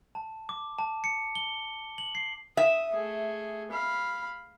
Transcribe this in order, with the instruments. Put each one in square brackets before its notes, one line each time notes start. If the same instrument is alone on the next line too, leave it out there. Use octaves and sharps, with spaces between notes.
[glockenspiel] A5
D6
A5
C#7
G7
F#7
C7
[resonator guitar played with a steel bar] E5 [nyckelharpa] D#6
[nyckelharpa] A3 G#4
F5 B5